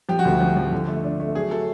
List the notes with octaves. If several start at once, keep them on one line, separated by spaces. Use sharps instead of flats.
F3 G4
F#4
D2 G4
F3
F3
D3
A3
D4
A3
F#3 G#4
F#3 A4